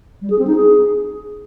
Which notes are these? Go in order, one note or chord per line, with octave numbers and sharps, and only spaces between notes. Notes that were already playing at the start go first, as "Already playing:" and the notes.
G3
G#4
C4
D#4
G#4